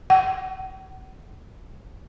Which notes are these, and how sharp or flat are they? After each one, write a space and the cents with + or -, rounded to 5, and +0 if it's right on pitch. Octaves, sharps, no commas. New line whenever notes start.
F#5 +35